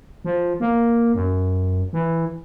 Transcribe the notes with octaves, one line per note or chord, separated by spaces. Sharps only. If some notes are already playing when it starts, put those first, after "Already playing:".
F3
A#3
F#2
E3